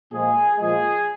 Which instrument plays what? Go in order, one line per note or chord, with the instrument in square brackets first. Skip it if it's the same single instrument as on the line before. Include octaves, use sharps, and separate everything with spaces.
[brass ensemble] A#2 F3 G#3 G#4
A#2 F3 G#3 G#4